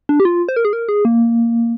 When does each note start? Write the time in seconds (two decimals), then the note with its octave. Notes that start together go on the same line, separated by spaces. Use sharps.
0.09 D4
0.20 G4
0.25 F4
0.49 C5
0.56 A#4
0.65 G#4
0.73 A#4
0.89 G#4
1.05 A#3